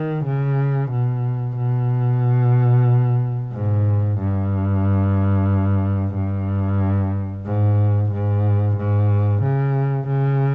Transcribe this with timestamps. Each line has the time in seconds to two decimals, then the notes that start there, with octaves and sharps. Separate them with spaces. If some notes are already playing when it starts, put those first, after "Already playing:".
Already playing: D#3
0.25 C#3
0.91 B2
1.57 B2
3.53 G#2
4.19 G2
6.15 G2
7.46 G#2
8.12 G#2
8.77 G#2
9.42 C#3
10.08 C#3